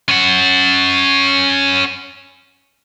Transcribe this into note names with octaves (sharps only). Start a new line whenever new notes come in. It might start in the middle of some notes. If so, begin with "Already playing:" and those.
C#4 F#5